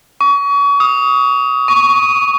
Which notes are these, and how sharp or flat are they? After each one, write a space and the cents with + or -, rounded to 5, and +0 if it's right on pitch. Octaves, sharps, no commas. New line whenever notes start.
C#6 +35
D#6 +20
C#6 +10